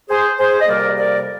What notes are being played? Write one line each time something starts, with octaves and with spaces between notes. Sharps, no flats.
G#4 C5
G#4 C5
D#5
F2 C3 G3 A#3 A#4 D5
A#4 D5